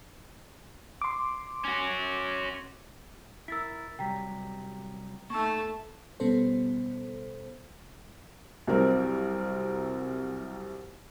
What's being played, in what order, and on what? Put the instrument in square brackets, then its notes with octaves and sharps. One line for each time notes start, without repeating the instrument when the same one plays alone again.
[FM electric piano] C6 D6
[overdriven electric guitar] C#4 F#4
[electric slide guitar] E4 A#4 [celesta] E6 A6 B6
[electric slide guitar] C3 F#3 G3 [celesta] G5 A#5 B6
[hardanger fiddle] A3 A5 [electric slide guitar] A#3 D#4 [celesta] C#6 E6
[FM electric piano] B2 G3 B3 C#4 A4 C5
[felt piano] C2 F#3 C4 A#4